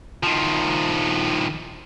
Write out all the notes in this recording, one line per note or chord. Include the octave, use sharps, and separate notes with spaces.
D#3 F3